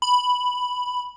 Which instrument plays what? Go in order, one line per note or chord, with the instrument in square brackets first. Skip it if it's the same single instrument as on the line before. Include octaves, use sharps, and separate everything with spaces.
[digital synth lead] B5